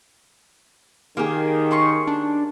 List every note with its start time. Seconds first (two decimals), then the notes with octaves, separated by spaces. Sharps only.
1.17 D#3 A#3 G4 G#4
1.71 C#4 C6 C#6
2.07 D4